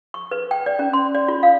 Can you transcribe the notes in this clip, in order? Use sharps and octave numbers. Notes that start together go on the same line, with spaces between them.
C#6
B4
G5
D5
C#4
C6
D5
F4
F5